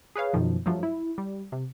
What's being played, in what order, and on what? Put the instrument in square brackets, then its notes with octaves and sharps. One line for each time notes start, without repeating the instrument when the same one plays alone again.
[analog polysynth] G#4 B4 C#5 F5
F#2 B2 D#3 F3
G2 F3 F#3 A3
E4
G3
C3